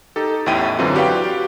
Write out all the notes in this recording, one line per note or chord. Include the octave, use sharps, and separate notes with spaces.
D#4 G4 A4
A1 E2 A2 E4 G5 D#7
F#2 D3 E3 F#3 C4 F4
F#4 G4 B4 D5 F5 G5